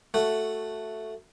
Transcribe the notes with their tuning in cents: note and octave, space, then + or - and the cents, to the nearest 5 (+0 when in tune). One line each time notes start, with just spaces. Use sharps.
A3 +5 F#4 +0